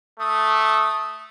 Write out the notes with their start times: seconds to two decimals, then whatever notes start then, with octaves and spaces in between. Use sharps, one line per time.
0.20 A3 D#6